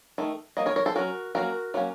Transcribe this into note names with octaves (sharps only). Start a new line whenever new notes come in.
D#3 A3
F#3 A#3 D#5
A#4 C#5
A#4 C#5
A4 C5
F#3 A#3 C#4 F#4 A#4
F#3 A#3 C#4 F#4 A#4
F#3 A#3 C#4